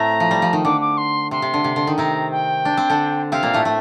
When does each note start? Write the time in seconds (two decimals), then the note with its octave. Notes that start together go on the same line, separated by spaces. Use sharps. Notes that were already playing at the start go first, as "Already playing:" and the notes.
Already playing: A2 A3 C4 A#5
0.20 F3
0.31 G3
0.42 F3
0.53 D#3
0.65 D3 D6
0.81 D6
0.97 C6
1.31 C3 C6
1.42 C3
1.54 D3
1.64 C3
1.76 D3
1.87 D#3
1.98 C3 C4 A#5
2.31 G5
2.65 D4
2.77 C4
2.90 D3 D4
3.31 C3 C4 F5
3.43 A#2 A#3
3.54 A2 A3
3.65 A2 A3